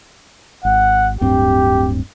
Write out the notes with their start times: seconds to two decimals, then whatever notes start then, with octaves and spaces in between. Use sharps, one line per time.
0.65 G#1 F#5
1.21 D1 G2 C4 G4